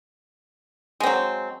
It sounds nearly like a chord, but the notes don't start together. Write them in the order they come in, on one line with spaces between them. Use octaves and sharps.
G#3 C4 F#3